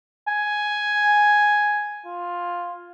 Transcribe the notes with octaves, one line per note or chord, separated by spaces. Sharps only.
G#5
F4